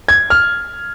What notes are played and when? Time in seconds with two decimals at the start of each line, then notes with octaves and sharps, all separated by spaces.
0.08 G#6
0.30 F6